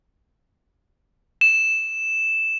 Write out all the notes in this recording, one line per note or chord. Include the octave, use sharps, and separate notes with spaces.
E7